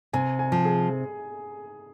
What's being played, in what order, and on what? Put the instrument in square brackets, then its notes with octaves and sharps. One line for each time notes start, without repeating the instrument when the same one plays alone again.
[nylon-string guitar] C3 [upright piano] G#5
[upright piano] G#5
[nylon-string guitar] F3
[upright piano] G#4